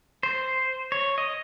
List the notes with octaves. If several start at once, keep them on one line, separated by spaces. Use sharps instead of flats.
C5
C#5
D#5